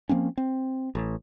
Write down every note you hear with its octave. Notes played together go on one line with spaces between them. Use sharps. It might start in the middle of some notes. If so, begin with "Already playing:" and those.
F3 A#3 C4 C#4
C4
A1